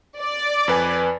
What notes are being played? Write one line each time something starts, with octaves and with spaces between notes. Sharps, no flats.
D5
F2 B4 G#5